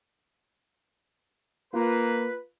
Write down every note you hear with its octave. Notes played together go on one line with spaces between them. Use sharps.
A#3 F4 B4